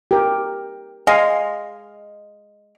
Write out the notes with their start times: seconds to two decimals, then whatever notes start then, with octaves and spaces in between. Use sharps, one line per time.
0.11 G4 A#4
1.07 G#3 F5